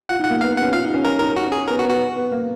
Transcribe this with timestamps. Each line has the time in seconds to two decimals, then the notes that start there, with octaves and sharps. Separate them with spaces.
0.09 F4 F#5
0.19 D#4
0.25 F#5
0.30 A#3
0.41 B3 F5
0.51 B3
0.57 C#4 F#5
0.73 F4 F5
0.84 D#4
0.94 C#4
1.05 C#4 A#4
1.20 D#4 A#4
1.36 D#4 F#4
1.47 C#4
1.52 G#4
1.68 B3 A#4
1.79 F#4
1.84 B3
1.90 F#4
2.16 B3
2.32 A#3